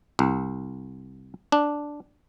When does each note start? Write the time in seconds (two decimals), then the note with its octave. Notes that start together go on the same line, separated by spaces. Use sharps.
0.19 C2
1.52 D4